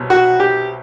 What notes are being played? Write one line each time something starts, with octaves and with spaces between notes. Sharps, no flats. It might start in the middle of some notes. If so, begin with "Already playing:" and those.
Already playing: C2 B2 F#3
F#4
G4